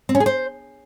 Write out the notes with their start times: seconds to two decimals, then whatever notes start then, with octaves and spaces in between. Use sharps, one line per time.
0.09 C4
0.15 C#4
0.20 G#4
0.26 C5